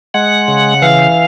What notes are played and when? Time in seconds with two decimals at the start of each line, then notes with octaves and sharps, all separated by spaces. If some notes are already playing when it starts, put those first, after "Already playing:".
0.14 G#3 F#5
0.48 C#3
0.82 E3 F5